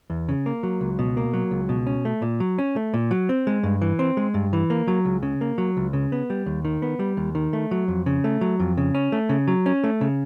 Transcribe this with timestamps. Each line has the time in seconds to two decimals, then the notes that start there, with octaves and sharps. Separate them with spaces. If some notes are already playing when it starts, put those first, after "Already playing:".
0.10 E2
0.29 C#3
0.46 A#3
0.63 F#3
0.81 C#2
0.99 B2
1.17 A#3
1.33 F#3
1.51 C#2
1.69 B2
1.87 C#4
2.05 A3
2.22 A#2
2.40 F#3
2.58 C#4
2.76 A3
2.94 A#2
3.11 F#3
3.29 C4
3.47 G#3
3.63 G2
3.82 E3
3.99 C4
4.17 G#3
4.34 G2
4.53 E3
4.70 A#3
4.88 F#3
5.05 C#2
5.23 C#3
5.41 A#3
5.58 F#3
5.77 C#2
5.93 C#3
6.12 B3
6.30 G3
6.46 D#2
6.65 D#3
6.82 B3
6.99 G3
7.17 D#2
7.35 D#3
7.53 A3
7.71 F#3
7.88 F2
8.06 C#3
8.24 A3
8.41 F#3
8.60 F2
8.77 C#3
8.95 C#4
9.12 A3
9.29 C#3
9.48 F#3
9.66 C#4
9.84 A3
10.01 C#3